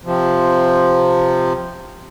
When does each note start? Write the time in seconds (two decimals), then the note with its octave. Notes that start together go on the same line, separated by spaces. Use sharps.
0.05 C3 F3